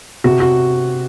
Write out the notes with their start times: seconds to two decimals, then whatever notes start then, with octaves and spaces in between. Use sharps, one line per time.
0.24 C3 F#4
0.40 F#4